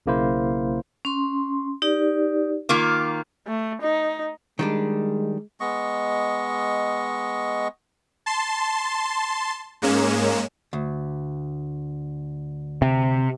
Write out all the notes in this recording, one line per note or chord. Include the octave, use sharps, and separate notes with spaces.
B1 C#3 A#3 E4 C5
C#4 C6
D#4 G4 D5
D#3 A#3 F4 D6
A3
D#4
D#3 G3 G#3 D4
G#3 B3 D#5 C#6
A5 C6
G#2 G#3 A#3 C#4 E7
D2
C3